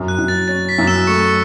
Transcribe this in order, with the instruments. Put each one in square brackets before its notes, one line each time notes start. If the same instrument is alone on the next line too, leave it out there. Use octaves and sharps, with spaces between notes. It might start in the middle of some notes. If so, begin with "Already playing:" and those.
Already playing: [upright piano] F#2
[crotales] F#6
[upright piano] F#2
[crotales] A6
[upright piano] C#4 [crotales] A6
[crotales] B6
[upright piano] F#2
[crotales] E6 E7
[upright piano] A3 [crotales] C#6 C#7